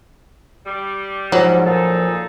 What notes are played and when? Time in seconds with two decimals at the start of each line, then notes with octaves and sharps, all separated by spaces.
0.66 G3
1.32 G#2 F3 F#3
1.66 A#2 D#4 G#4 A4